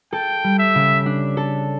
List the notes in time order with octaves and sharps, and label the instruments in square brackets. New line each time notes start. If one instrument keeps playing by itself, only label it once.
[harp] A4 [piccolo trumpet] G5
[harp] G3
[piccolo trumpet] E5
[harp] C#3
D4
A4